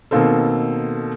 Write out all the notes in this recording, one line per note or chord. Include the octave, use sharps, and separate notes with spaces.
B2 D#3 A#3 C4 A4